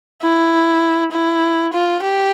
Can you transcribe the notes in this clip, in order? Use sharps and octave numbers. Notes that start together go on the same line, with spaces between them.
E4
E4
F4
G4